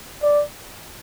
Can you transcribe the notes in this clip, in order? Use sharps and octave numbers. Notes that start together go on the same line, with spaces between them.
D5